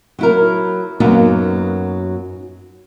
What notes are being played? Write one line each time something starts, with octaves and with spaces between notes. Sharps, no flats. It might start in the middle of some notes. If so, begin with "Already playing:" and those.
F#3 E4 A#4
F#2 F#3 A#3 B3 D#4